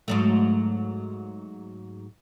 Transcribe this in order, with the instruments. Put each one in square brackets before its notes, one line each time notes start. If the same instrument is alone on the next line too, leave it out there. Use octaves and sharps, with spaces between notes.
[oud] G#2 F#3 A3